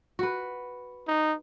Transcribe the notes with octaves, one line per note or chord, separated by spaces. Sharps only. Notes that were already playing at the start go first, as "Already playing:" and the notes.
F#4 B4
D#4